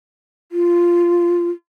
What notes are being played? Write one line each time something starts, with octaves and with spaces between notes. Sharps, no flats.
F4